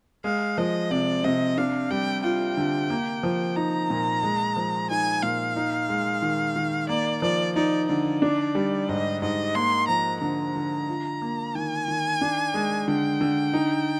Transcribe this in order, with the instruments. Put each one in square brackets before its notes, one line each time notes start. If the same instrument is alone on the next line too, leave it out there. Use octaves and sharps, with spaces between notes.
[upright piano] G#3 [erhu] F5
[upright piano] F3 [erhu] D#5
[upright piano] C3 [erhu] D5
[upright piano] C3 [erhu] D#5
[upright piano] D4 [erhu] F5
[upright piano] G3 [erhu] G5
[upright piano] F4 [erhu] G5
[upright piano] D3
A#3
F3
[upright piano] D#4 [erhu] A#5
[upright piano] A#2
G#3
F3
[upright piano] D#4 [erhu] G#5
[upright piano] A#2 [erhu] F5
[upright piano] D#4
G#3
D#3
D#3
[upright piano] A#3 [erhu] D5
[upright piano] F3 [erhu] D5
[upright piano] D#4 [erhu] D5
[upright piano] D3 [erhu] D5
[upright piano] D4
G3
[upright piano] G#2 [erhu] D#5
[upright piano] G#2 [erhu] D#5
[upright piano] A#3 [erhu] C6
[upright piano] F3 [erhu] A#5
[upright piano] D3 [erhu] A#5
[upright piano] D3
F4
A#3
[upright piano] D#3 [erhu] G#5
[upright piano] D#3
D4
G#3
[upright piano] D3 [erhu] G5
[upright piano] D3
D#4